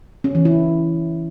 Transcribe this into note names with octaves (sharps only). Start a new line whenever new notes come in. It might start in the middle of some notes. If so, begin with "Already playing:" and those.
C#4
E3
E4